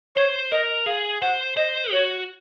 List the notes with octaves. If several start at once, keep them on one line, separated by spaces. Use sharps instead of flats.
C5 C#5
A#4 D#5
G#4 F5
C5 F#5
C5 D#5
F#4 C#5